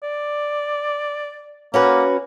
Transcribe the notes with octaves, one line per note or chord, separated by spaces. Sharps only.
D5
A#3 C#4 F#4 B4